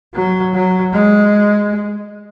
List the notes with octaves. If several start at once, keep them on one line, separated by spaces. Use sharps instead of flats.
F#3
F#3
G#3